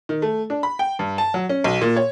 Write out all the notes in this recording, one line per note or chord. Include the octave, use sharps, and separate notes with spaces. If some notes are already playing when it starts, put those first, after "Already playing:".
D#3
A3
D4
B5
G5
G2
A5
F#3
C#4
B1
A#2
C#5